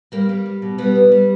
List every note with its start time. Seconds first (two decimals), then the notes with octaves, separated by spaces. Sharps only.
0.12 G3 A#3
0.29 G3
0.46 G3
0.62 B2
0.78 G3 B3
0.95 G3
1.12 G3